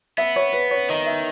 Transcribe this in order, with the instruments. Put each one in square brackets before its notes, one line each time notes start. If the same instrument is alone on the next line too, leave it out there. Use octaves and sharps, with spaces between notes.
[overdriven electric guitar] B3 [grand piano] E5
[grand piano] C#5
B4
C#5
[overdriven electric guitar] D#3 [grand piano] D#5
[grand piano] E5